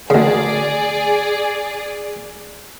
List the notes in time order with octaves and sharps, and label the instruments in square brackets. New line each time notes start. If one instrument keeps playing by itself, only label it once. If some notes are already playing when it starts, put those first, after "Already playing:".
[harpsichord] D2 C#3 [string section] G#4 D5